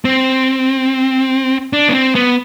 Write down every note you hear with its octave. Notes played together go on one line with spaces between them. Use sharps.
C4
D4
B3
C4
B3